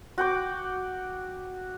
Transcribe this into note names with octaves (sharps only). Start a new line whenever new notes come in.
F#4 G5 D6